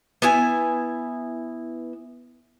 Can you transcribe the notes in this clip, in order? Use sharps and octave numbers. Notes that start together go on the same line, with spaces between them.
B3 E4 G#5